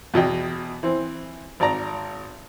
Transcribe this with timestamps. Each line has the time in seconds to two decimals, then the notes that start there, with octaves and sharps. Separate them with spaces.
0.14 E2 B2 D#5 G5
0.83 E3 C4
1.60 G#1 D5 A#5